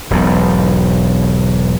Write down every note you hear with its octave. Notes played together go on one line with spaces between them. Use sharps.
E1 B1 G#2